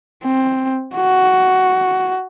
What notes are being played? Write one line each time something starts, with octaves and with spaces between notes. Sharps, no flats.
C4
F#4